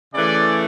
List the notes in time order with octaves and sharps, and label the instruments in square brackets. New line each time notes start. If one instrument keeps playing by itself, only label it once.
[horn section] C#3 E3 A3 D5